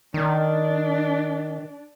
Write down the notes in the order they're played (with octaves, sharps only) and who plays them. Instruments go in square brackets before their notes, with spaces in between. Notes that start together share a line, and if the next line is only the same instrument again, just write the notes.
[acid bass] D#3 [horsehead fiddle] D4